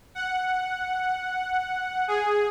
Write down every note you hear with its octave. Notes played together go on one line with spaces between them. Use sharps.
F#5
G#4